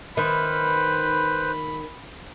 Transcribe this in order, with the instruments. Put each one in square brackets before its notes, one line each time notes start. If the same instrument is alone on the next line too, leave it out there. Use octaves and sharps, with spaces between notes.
[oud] D#3 [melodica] B4 C5 [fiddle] B5